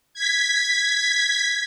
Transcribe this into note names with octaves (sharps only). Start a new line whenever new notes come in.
G#6 B6